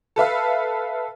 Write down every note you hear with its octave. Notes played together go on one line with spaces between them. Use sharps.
A4 B4 E5 F5